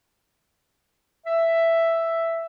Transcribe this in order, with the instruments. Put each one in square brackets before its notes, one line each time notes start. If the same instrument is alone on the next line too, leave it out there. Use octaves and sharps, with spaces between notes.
[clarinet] E5